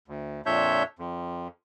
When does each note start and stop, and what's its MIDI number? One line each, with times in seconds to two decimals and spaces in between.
0.08 0.41 38
0.46 0.83 41
0.46 0.83 46
0.46 0.83 62
0.46 0.83 73
0.46 0.83 76
0.46 0.83 91
0.99 1.48 41